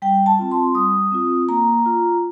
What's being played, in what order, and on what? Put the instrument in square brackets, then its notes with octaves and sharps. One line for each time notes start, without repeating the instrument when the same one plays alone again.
[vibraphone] G3 G5
A5
C4 F4
C6
G3 D#6
C4 F4
A#3 A#5
F4